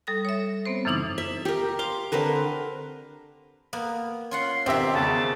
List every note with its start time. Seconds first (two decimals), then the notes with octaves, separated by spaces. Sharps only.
0.07 G3 A4 D#6 A#6
0.25 C#5 E5
0.66 B3 C4 C5
0.85 F#2 C#3 E3 D#4 E4 D6
1.18 E5
1.45 G4 A#4
1.79 F5 C6 D6
2.12 D3 C4 A#4 B4
3.73 A#3 B3
4.31 C#4 F4 F#5 C6
4.66 B2 D#3 C4 G4 E5
4.94 E2 C#3 A5